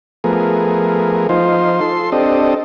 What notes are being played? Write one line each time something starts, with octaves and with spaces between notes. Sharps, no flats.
F3 A3 B3 G#4 A#4
F3 D#4 F4 C5
A4 C6
C4 D4 G4 A4 D#5